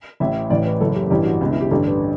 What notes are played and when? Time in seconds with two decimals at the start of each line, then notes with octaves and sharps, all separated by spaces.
0.20 A1 A2 E3 E5
0.50 A1 A2 E3 D5
0.65 B4
0.81 F#1 F#2 E3 A4
0.95 G4
1.10 A1 G2 E3 G4
1.26 F#4
1.41 C#2 B2 D4
1.51 E4
1.61 G4
1.71 A1 G2 D3 A4
1.86 B4